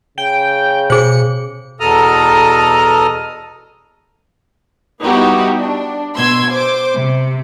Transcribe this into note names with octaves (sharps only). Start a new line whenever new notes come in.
C#3 G5
B2 G#4 C5 C#7
E2 B2 A4 A#5 D#6 F6
G3 B3 D#4 E4 F#4 G4
D4
B2 C6 E6 G#6
C5 D6
C3